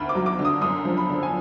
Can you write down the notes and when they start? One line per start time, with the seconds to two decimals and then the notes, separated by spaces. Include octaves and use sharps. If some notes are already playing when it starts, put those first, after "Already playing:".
Already playing: D2 D#3 B5
0.09 D6
0.15 F#3
0.26 D6
0.39 D3
0.45 D#6
0.61 F#2 D#6
0.85 F3
0.97 B5
1.09 D3
1.23 G#5